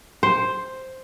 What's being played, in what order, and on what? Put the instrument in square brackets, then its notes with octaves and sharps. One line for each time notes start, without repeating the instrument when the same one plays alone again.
[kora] C5